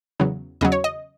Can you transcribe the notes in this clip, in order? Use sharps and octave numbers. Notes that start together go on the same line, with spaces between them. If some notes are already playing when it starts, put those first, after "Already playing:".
E2 C#3 F#3
E2 C#3 F#3 D#5
C#5
D#5